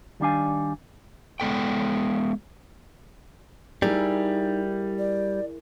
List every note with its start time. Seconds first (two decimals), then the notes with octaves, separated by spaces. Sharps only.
0.20 D#3 G3 D4 F5 G#5
1.40 G#3 B3 A4 G5
3.82 G3 D#4 E4 G#4 A#4
4.98 D5